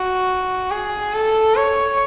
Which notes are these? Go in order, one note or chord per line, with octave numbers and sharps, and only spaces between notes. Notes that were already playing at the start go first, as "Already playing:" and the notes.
Already playing: F#4
G#4
A4
C#5